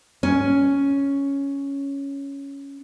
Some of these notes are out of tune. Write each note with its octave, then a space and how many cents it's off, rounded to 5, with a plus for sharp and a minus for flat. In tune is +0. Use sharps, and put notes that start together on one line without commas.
C#4 +5